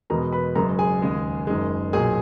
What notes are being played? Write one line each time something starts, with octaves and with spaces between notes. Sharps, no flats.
E2 B2 G#3 A#4 A#5
B4 B5
F#1 F#2 C#3 G#3 A#4 A#5
G#4 G#5
D#2 C#3 G#3
F#1 F#2 D#3 G#3
B1 A#2 F#3 G#4 G#5